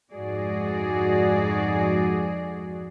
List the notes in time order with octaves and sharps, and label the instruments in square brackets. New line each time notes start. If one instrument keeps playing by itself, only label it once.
[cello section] F2 G#2 F#4 G#4 D5